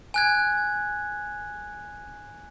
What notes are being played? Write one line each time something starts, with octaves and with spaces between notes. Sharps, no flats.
G#5 F#6 G#6